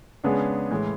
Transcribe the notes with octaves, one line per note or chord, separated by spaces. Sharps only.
C#3 G#3 B3 D4 G#4
A2 E3 G#3